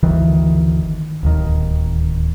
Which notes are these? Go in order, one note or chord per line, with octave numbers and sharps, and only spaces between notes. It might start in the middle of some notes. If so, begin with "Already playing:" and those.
G1 D2 D#3 E3
D1 D#2 D#3